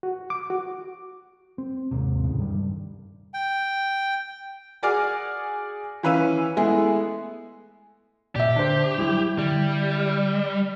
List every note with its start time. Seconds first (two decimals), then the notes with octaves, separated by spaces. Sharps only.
0.03 F#4
0.30 D6
0.50 F#4
1.58 C4
1.91 D#2 G#2 C3
2.23 F1 C#2 A2 C#3
2.38 G2 D#3 F3 G3
3.34 G5
4.83 F#4 G#4 D5 G#5 D6 F6
6.03 E3 C#4 B4 F5 E6 D#7
6.57 G#3 A3 B3 E4 G#4
8.36 A#2 G4 D5 E5
8.56 D3 D4 C5
8.98 F#3 G3 E4
9.38 D3 G3